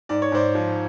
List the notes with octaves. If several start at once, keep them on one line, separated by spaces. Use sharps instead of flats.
G#2 D5
C#5
G#2 C5 D5
F3